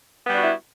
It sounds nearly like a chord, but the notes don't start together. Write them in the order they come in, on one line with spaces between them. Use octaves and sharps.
B3 G3 D4 F#4 E4